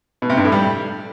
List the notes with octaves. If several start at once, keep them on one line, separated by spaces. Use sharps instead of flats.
B2
C3
G2
A2
G3